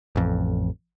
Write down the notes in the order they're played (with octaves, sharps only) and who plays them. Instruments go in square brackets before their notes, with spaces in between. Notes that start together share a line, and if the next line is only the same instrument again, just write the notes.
[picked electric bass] A1 F2